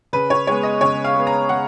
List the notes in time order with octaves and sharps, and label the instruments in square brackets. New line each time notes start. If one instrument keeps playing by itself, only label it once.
[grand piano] C#3 B4
C#5
G#3 B3 C#5
D#5
C#3 C#5
F5
G#3 B3
A#5
C#3 F#5